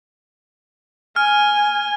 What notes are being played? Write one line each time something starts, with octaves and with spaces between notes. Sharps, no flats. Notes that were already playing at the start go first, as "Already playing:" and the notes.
G#5 F6